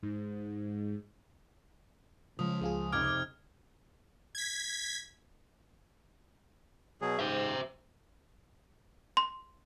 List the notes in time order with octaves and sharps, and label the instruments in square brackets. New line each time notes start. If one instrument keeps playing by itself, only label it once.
[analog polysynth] G#2
[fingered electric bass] C#3 G#3 [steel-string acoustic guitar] F3 [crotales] D#6
[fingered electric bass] C#2 [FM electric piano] G#3 F4 G#4
[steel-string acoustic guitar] F2 C3 D#4 [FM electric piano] D6 [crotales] F6 G#6
[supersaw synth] G#6 B6
[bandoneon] B2 F#3 G#4
[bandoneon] G#2 [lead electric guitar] C5 E5
[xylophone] C6